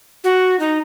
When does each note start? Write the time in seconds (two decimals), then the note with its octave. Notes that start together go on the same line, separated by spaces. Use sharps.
0.24 F#4
0.59 D#4